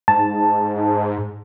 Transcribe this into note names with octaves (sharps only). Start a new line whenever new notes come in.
G#2 A5